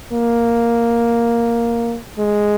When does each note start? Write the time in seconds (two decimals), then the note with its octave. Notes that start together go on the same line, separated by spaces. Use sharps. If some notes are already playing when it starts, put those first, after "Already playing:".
0.13 A#3
2.18 G#3